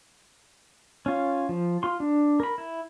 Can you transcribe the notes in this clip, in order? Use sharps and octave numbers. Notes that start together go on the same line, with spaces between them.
C#4 F4
F3
F4 C6
D4
A#4 B5
E4